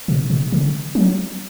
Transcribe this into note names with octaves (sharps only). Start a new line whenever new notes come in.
B2
B2
C#3
F#3